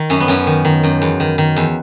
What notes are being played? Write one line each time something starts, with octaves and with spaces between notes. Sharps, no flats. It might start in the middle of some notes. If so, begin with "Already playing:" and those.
Already playing: D#3
F#2 C#4
B3
F#2 C#4
D#3
D#3
F#2
E2
D#3
D#3
E2